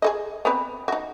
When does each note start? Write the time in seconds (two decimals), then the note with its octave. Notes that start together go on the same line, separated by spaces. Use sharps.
0.02 G#4 A4 D#5
0.45 B3 C4 B4
0.88 D#4 F#4